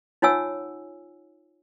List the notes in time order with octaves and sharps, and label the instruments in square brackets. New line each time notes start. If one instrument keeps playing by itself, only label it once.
[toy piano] D#4 F4 C#5 F#5 G#5 E6